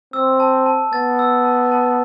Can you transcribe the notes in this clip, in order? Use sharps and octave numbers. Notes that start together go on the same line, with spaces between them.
C4 E6
A5
A5
B3 A6
E6
A5
A5